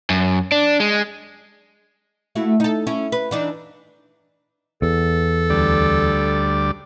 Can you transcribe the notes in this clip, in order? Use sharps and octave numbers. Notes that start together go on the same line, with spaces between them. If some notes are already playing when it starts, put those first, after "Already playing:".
F#2
D4
G#3
A3 E4 F#4
D#4 A4
C#4 E4
B4
E3 D4 D#4
E2 A4
D2 G3 D5